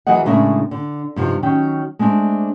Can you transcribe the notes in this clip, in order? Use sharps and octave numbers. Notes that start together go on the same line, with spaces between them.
E3 F#3 G#4 A#4 D#5 F#5
A2 C#3 G#3 D4 A#4 E5
D3
G2 C3 F3 C4 D#4
D#3 F#3 C#4 G5
G#3 A3 C4 D4